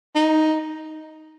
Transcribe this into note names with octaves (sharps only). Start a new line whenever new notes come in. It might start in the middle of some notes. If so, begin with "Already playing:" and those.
D#4